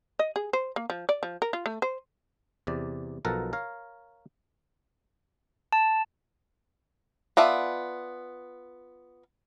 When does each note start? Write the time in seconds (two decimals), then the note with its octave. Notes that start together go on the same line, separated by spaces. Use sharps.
0.19 D#5
0.36 G#4
0.53 C5
0.76 A#3
0.90 F3
1.09 D5
1.23 F3
1.42 A#4
1.53 F4
1.66 A3
1.82 C5
2.67 E2 C3 D5
3.25 B1 B2 F3 A4 A#4 F#5
3.53 A#4 C#5 F5
5.73 A5
7.37 B3 F4 D5 E5 A5